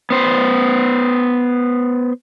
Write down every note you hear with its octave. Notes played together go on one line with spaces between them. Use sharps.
B3 C5